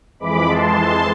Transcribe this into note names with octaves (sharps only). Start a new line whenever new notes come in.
F2 E3 G#3 B5 D6
A5 C6